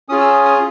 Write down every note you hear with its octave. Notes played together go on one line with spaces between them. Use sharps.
C#4 F4 G#4 D#6
E6
D#6
D#6